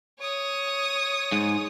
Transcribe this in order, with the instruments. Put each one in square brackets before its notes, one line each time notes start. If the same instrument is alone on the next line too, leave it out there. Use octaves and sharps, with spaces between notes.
[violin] C#5 D#6
[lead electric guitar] G#2